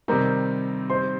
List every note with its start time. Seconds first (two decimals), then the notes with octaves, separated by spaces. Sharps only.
0.08 C3 D#3 G3 C4 D#4 A#4 A#5
0.90 C5 C6